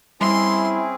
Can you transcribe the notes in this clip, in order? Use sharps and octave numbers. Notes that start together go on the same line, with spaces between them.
G3 C4 C#4 E4 G#4 C6